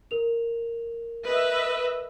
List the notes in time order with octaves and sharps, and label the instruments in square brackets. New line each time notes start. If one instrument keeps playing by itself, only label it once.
[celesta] A#4 F7
[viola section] B4 D#5 E5